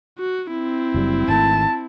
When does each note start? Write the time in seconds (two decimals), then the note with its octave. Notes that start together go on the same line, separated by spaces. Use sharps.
0.19 F#4
0.51 C4 E4
0.94 F#1 F#3 G3
1.28 G#1 D#3 A3 A5